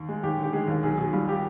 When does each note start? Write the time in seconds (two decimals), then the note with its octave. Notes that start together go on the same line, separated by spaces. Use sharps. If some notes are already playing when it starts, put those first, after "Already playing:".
Already playing: D#2
0.09 G#3
0.23 D#2 G4
0.38 D3
0.43 G4
0.53 G#3 G#4
0.68 D#2
0.83 B1 G#4
0.98 B2 G#4
1.13 G3 F4
1.28 G4